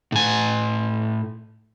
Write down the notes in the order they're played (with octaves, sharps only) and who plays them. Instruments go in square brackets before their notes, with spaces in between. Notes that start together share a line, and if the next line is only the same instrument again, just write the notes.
[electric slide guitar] A2 G#5